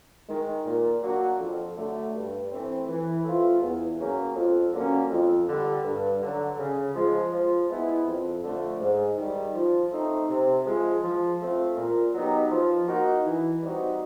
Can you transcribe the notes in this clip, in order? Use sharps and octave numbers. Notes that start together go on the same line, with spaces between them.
D#3 G#3
A#2
F#3 A#3 D4 F#4
F2
D3 F#3 A3
G2
E3 A3 C4
E3
A3 C4 F4
E2
C#3 F#3 A#3 C#4
F2
D3 F#3 A#3 C#4
F2
D3 G3
G2
D3 F#3
C#3
F3 G#3
F3
G#3 B3 E4
F2
D3 F3 A3
G#2
D#3 G3
F3
A3 C4 D#4
C3
F3 G#3
F3
A3 C4 F4
A#2
F#3 B3 D#4 G4
F3
A#3 D#4 F#4
E3
G3 C4 D#4 F#4